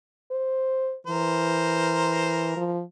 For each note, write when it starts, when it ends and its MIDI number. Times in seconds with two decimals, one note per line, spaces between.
0.31 0.96 72
1.07 2.56 52
1.07 2.74 70
1.07 2.74 72
2.57 2.82 53